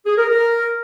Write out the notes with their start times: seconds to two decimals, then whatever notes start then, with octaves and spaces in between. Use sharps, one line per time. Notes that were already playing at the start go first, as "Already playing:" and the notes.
0.06 G#4
0.17 A#4
0.29 A#4